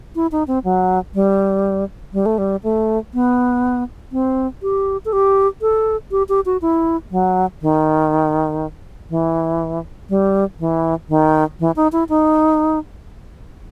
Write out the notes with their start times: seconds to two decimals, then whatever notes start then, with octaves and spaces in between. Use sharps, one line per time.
0.15 E4
0.32 D#4
0.47 C4
0.64 F#3
1.14 G3
2.13 G3
2.26 A3
2.38 G3
2.63 A3
3.14 B3
4.12 C4
4.62 G4
5.05 A4
5.13 G4
5.62 A4
6.11 G4
6.29 G4
6.46 F#4
6.62 E4
7.11 F#3
7.62 D#3
9.10 E3
10.09 G3
10.59 E3
11.09 D#3
11.60 E3
11.76 D#4
11.92 E4
12.09 D#4